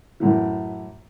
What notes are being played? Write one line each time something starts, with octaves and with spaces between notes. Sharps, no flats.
F#2 A2 E3